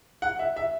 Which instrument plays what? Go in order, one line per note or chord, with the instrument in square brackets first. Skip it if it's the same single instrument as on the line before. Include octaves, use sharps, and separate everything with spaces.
[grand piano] F#5
E5
E5